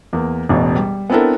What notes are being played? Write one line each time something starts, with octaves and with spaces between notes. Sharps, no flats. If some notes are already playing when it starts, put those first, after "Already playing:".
E2 A#3
E1 A1 B2
G3
B3 C4 D4 E4 A4 A#4